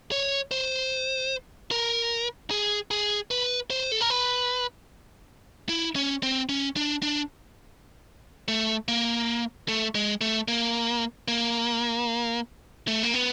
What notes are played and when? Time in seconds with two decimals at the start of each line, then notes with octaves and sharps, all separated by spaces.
0.12 C#5
0.51 C5
1.71 A#4
2.51 G#4
2.91 G#4
3.31 B4
3.70 C5
3.92 A4
4.01 A#4
4.10 B4
5.69 E4
5.96 C#4
6.23 C4
6.49 C#4
6.76 D4
7.02 D4
8.48 A3
8.88 A#3
9.68 A3
9.95 G#3
10.21 A3
10.48 A#3
11.28 A#3
12.88 A3
13.03 A#3
13.14 B3